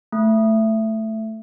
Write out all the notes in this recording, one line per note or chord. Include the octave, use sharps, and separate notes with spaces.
A3